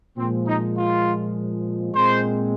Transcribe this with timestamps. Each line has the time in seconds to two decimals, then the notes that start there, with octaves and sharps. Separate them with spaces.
0.18 A#2 F3 G#3 C4
0.47 D#4
0.77 F4
1.94 A#2 G#3 C4 C5